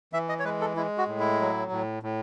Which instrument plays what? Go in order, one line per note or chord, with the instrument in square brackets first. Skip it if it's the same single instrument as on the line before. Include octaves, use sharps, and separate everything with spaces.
[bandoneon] E3 E5
D#5
C#5
G#3 B4
A4
G#3 E4
F#4
A2
E4
F#3
A2
A2